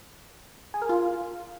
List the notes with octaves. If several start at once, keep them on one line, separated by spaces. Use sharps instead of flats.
G#4
A#4
F4